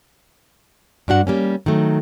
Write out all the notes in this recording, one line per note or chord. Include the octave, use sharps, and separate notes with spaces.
G2 D4 F#4 F#5
G3 A#3 C#4
D#3 F#3 A3